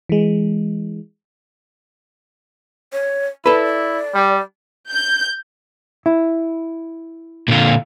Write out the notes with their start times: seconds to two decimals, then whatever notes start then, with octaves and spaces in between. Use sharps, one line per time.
0.09 E3 G#3
2.93 C#5
3.46 E4 A4 B4 D5
4.15 G3
4.91 G6
6.06 E4
7.48 A#2 D3 F4